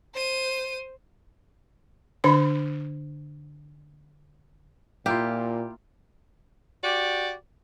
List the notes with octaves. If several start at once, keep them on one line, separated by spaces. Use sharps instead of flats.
C5 D#7
D3 D4 B5
A#2 A#3 E4 F4 G4
F#4 G4 D5